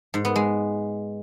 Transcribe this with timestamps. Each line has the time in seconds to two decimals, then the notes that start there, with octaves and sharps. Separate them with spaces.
0.14 G#2
0.25 B3
0.36 G#3